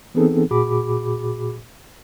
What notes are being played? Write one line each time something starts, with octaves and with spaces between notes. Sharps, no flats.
E3 B3 C4 D#4 G#4 A4
A#2 F#4 G#4 B5 D6